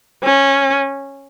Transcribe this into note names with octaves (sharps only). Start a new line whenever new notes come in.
C#4